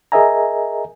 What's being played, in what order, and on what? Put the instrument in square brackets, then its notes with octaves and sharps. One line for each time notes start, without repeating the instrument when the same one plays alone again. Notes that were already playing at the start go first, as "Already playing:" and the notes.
[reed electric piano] G#4 A#4 D#5 E5 G#5 A#5